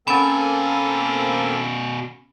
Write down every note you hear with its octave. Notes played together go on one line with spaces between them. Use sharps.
B2 A#3 C4 C#4 A4 G#5 B5